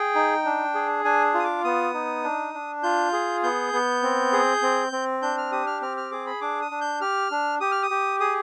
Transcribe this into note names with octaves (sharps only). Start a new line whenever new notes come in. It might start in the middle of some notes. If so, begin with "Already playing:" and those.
Already playing: G#4 G5
D#4
D4
G#4
D4 G#5
F4 D#6
D6
B3 D#6
D#4
D4
D4
F4 G6
G#4
B3 G6
B3
C4
G#4
C4
C4
D4 G6
F6
G4 D#6
F6
C4 F6
F6
G#4 D6
B5
D4 D6
D#6
D4
G6
G4 F6
D4
G4 D#6
F6
D#6
G4
G#4 D#6